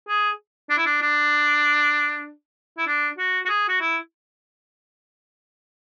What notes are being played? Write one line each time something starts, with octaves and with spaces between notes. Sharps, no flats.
G#4
D4
E4
D4
D4
E4
D4
F#4
F#4
G#4
F#4
E4